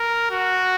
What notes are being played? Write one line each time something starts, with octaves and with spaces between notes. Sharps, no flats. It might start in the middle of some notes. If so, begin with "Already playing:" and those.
Already playing: A#4
F#4